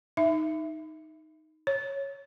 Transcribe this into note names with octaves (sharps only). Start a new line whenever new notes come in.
D#4 E5
C#5